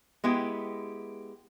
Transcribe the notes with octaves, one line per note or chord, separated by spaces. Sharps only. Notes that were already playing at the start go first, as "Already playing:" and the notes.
G#3 B3 E4 G4